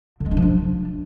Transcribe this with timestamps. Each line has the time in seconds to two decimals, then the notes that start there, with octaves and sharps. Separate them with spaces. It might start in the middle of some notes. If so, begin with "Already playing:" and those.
0.20 D3
0.26 G#3
0.31 D4
0.37 F3
0.42 D4